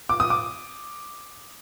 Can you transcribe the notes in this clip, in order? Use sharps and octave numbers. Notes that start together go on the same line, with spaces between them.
D6
D#6
D6